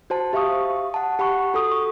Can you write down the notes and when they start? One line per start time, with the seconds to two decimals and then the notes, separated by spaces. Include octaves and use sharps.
0.10 F#4 C5 A5
0.33 G4 E5 F5 C#6 D#6
0.94 F#5 A5
1.19 G4 F#5 B5 C#6
1.54 F#4 A4 D#6
1.71 C#6